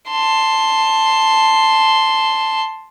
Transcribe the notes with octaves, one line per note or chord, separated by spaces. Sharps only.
A5 C6